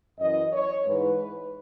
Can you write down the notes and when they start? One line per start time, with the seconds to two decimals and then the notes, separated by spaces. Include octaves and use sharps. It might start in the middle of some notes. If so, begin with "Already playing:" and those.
0.19 F#2 E3 D#5
0.53 C#5
0.86 G#2 E3 B4